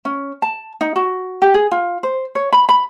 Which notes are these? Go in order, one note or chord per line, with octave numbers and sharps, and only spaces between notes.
C#4
A5
D#4
F#4
G4
G#4
F4
C5
C#5
B5
B5